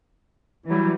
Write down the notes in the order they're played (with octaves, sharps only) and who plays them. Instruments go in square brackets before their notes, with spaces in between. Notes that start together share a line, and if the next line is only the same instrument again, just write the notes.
[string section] E3 F#3 G3 [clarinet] E4